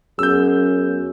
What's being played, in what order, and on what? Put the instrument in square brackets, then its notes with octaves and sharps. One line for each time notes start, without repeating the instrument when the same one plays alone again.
[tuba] F#2 [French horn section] B3 C#4 G#4 [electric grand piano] E6 G6